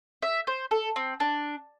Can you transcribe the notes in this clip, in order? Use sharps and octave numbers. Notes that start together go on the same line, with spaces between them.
E5
C5
A4
C4
D4